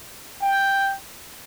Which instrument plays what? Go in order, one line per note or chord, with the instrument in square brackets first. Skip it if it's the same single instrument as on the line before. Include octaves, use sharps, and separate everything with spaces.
[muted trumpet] G5